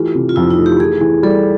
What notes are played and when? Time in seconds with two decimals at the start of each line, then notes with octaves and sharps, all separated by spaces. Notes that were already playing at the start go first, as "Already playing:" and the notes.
Already playing: E3 A3 F4 G4
0.15 C3
0.29 F4
0.36 F2 E4
0.51 D#4
0.58 A3
0.66 G4
0.80 E3 G#4
1.01 E3
1.23 G3 A4